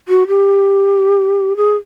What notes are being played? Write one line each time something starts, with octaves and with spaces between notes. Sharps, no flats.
F#4
G4
G#4